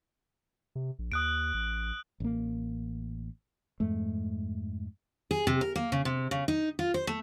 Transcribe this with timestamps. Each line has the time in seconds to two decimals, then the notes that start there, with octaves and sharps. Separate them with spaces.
0.75 C3
0.99 A#1
1.12 D#2 D#6 F#6 D7
1.54 A1
2.20 A1 A#3
3.80 F2 G#2 A3
5.31 G#4
5.47 C3
5.61 A#4
5.76 A#3
5.92 C#3
6.05 C3
6.31 C#3
6.48 D#4
6.79 F4
6.94 C5
7.07 A3